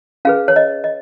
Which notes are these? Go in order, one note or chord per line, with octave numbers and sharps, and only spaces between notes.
C#4 G#4 B4 F5
C#5
D#5
D#5